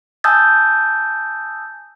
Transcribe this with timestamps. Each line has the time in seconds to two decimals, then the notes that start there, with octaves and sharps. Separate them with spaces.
0.24 G#5 A5 D#6 E6 G6 A6